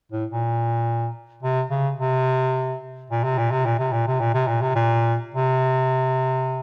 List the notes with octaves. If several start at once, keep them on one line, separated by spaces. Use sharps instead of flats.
A2
A#2
C3
C#3
C3
A#2
C3
A#2
C3
A#2
C3
A#2
C3
A#2
C3
A#2
C3
A#2
C3